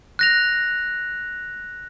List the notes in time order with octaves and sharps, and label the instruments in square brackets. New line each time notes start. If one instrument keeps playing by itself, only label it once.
[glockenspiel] F#6 A#6 F7